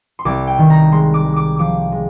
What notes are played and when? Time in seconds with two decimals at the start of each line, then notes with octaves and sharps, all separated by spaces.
0.19 C6
0.25 C2 D6
0.47 G5
0.58 D#3
0.70 A#5
0.92 G#3 C6
1.14 D6
1.25 G#3
1.36 D6
1.59 F3 D6
1.92 G#3